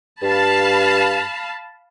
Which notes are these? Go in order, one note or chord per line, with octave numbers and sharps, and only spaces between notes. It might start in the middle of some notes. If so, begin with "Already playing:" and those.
G2 F5 A5 B5